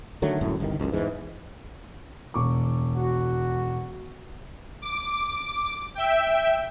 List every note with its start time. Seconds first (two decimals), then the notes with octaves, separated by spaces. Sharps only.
0.22 D3 D#3 F#3 A3
0.41 D1 G1 F#2 A2
0.60 G1 C2 B2 D#3
0.79 C#2 F#2
0.92 E2 G#2 E3
2.34 E1 C#6 D6
2.96 F#4
4.82 D6
5.95 E5 G5